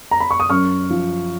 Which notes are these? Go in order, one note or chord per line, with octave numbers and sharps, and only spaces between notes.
A#5
B5
C#6
D#6
F#2 C#6 F6
F3